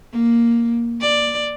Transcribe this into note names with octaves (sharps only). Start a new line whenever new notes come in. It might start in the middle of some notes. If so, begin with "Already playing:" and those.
A#3
D5